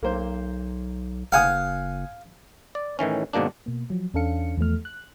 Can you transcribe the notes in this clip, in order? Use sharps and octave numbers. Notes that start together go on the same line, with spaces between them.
B1 A#3 C5
F#1 F5 F#5 G#5 D#6
D5
A2 D#3 E3 C#4
G#1 G#2 B2 A#3 D4
B2 A#3
F3 F#3
E2 C#4 D4 A4 F5 C#7
E2 F3 A3 F6
F#6